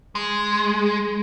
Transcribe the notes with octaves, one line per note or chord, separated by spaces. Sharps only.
G#3